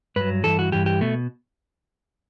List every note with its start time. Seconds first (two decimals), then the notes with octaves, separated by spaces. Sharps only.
0.16 G2 F#3 B4
0.44 G2 E3 A4
0.59 F#4
0.72 G2 E3 G4
0.86 G4
1.01 B2 A3